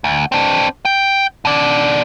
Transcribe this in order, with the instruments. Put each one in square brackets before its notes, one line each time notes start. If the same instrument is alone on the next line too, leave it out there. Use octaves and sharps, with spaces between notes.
[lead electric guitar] D2
C4 D4
G5
B2 D5